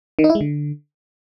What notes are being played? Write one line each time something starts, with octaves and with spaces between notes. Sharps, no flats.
D#3
D#4
E4
G#3
D3